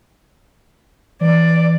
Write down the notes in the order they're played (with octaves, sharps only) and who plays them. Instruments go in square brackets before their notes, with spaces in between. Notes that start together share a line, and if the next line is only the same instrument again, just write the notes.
[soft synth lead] E3 [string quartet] D5